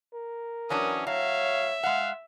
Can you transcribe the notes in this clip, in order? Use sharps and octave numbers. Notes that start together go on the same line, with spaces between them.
A#4
E3 F#3 C#4 D4 D#6
F#3 C#5 E5 F5
G#3 F5 F#5